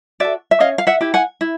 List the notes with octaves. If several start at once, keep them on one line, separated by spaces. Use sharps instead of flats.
F#4 A4 D5 E5
E5
C#4 D#5 F5
F5
E5 F#5
E4 G4
F#5 G#5
E4